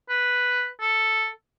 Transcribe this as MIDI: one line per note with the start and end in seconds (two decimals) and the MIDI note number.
0.10 0.68 71
0.81 1.29 69